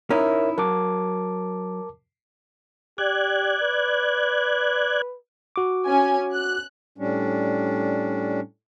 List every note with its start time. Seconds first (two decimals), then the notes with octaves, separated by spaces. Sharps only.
0.10 C#4 D#4 E4 A#4 C#5 E5
0.58 F#3 A#4 A5 D6
2.98 G4 D5 F#6 G#6
3.62 B4
5.56 F#4 D6
5.86 C#4 G#5
6.34 F#6
6.98 A2 G3 C#4 D4